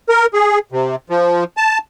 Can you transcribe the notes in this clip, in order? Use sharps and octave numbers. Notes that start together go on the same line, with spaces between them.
A#4
G#4
C3
F3
A5